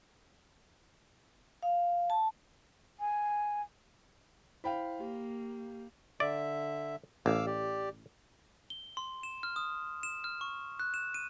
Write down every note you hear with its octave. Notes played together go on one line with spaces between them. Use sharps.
F5
A5
G#5
E4 C5 F5 G5 B5
A#3 G4
D3 D5 E5
A1 F5 D6 E6
G4 D5
G7
C6
E7
F6
D#6
E7
F6
C#6
F#6
E7
D#7